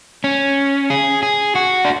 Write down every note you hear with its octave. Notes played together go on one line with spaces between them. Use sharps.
C#4
G#4
G#4
F#4
D4